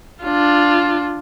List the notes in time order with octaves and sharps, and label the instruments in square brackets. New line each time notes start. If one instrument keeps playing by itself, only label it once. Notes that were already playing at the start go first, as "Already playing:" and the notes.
[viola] D4 F4